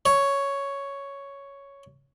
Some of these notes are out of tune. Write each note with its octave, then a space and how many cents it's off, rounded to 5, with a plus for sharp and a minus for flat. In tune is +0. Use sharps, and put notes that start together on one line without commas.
C#5 +5